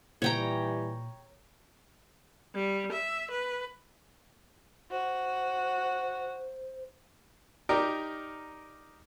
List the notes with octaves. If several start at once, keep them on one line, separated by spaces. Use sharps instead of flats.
A#2 E3 G3 C#5 G5 A#5
G3
E5
B4
F#4 C5
D#4 G4 A#4 D5